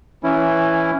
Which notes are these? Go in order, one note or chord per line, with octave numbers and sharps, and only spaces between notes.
E3 C#4 E4